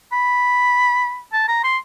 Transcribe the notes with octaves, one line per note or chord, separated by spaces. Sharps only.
B5
A5
A#5
C6